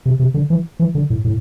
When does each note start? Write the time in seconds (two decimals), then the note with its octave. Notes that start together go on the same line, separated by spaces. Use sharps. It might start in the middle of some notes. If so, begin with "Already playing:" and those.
0.06 C3
0.19 C3
0.34 D3
0.50 E3
0.79 E3
0.95 D3
1.10 A2
1.25 A2